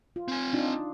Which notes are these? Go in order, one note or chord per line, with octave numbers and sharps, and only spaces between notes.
F4
C4 G#5
D4 D#4 F4